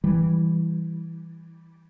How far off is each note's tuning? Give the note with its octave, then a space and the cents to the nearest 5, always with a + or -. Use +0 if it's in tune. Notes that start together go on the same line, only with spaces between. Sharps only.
E3 +0 G3 +0